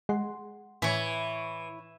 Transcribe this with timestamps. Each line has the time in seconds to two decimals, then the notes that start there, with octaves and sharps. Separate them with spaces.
0.09 G#3 F#5 C6
0.82 A2 E3 E4 C#5